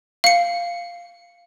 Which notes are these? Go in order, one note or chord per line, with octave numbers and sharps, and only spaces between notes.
F5 C#7